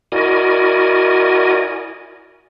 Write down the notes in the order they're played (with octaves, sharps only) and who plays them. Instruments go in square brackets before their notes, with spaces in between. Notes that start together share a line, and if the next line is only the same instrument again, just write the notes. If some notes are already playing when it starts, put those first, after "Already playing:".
[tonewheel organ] E4 F#4 A#4 D5 D#5 G#5